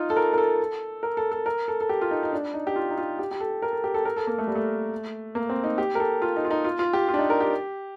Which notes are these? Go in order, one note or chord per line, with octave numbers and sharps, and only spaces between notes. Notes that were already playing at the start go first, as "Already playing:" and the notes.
Already playing: D#4 F4
A4
A#4
A#4
A4
A#4
A4
A4
A#4
A4
A4
G4
F4
D#4
D#4
D4
D#4
G4
F4
D#4
F4
G4
G4
A4
A#4
A4
G4
A4
A#4
A4
A#3
A3
G3
A3
A#3
C4
D#4
G4
A#4
A4
F4
D#4
F4
D#4
F4
F4
G4
F4
D4
D#4
A#4
G4